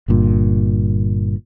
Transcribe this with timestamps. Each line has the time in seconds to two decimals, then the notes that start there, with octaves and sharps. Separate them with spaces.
0.08 G1 G2 A#2